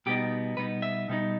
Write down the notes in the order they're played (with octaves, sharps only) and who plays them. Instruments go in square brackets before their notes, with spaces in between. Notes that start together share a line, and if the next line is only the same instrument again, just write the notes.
[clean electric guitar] B2 G3 B3 D#4 G4
B2 G3 B3 D#4 B4
E5
B2 G3 B3 D#4